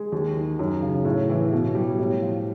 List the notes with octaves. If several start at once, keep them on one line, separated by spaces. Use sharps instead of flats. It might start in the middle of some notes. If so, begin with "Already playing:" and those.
Already playing: G#3
D#2
D#3
F#2
C#3
A2
E3
B2
G3
A2
F3